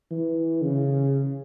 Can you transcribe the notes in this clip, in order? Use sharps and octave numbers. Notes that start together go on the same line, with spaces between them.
E3
C#3